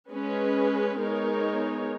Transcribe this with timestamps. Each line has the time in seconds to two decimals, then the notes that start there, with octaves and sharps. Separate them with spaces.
0.11 G#3 C#4 G#4 B4
0.98 G#3 B3 D#4 A#4 C#5